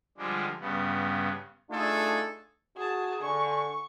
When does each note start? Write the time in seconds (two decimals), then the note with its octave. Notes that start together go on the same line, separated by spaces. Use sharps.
0.18 D3 F3 G3 G#3 D4
0.60 G2 C#3 B3
1.70 A3 D4 D#4 F4 G#4 A4
2.77 F#4 G#4 A5
3.22 D3 G#5 C#6